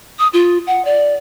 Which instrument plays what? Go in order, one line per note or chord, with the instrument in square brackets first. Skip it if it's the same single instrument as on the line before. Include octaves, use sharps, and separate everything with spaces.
[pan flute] D#6
F4
F#5
D5